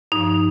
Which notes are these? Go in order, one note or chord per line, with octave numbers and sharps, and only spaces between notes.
G2 F3 D#4